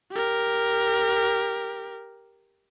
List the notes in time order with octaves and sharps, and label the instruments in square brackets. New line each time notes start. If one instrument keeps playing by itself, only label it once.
[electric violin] G4 A#4